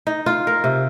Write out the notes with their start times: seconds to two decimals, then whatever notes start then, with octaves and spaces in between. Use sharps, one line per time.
0.07 D#4
0.26 F4
0.47 A#4
0.64 C3